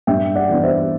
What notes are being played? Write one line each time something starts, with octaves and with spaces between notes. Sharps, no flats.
G2 E5 G5
D5 F#5
E3 B3 D4
C5 E5